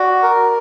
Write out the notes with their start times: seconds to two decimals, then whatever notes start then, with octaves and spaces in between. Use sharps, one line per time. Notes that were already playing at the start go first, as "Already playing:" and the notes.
Already playing: F#4 D5
0.23 A#4